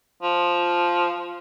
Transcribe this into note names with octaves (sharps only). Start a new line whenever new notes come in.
F3